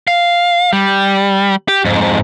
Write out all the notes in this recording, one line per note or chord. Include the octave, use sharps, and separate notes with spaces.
F5
G3
G4
F2 G#2